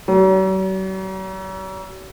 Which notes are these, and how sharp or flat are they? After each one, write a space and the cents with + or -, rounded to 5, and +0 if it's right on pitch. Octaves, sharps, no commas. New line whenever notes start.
F#3 +45